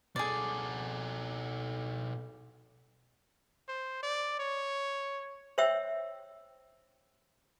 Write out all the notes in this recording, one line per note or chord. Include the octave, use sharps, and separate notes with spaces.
B2 G#4 A4 D5
C5
D5
C#5
C5 C#5 E5 G5 E6